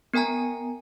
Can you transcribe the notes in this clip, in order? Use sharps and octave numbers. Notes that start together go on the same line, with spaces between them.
B3 A#4 G5 G#5 A#5